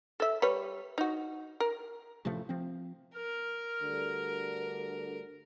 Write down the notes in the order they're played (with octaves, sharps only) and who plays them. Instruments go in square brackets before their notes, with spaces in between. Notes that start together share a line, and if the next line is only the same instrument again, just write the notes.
[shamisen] A4 E5
G3 B4 C#5
D#4 F#4
A#4
[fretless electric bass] A1 C3 F3 A3
F3 C4
[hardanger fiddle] A#4 [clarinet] F6
[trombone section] D2 G2 D3